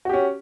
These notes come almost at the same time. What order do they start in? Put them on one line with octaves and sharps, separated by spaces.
F#4 G4 C#4